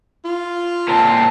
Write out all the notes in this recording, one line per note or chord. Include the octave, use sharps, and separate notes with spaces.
F4
A#2 C4 A5